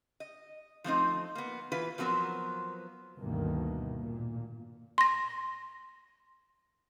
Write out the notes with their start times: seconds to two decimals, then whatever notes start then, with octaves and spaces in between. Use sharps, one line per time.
0.20 D#5
0.84 F3 A3 C4 D#4
1.35 A#3 B3
1.72 E3 F4 B4
1.98 F3 F#3 B3 C4 A#4
3.18 D2 G2 B2 D#3 A#3
4.00 A#2
4.98 C6 A#6